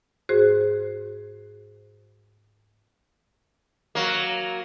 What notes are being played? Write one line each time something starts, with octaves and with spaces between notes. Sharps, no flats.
G#2 F#4 G#4 C5
F#3 A#3